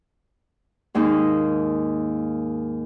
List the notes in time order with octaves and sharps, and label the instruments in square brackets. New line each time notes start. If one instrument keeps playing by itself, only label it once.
[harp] D#2 G#2 A#3 D#4